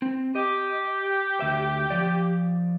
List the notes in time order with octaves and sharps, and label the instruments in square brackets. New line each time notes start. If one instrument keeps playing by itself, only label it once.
[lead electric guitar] C4
[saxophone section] G4 [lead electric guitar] D#5
[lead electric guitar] D2 E5
F3 D5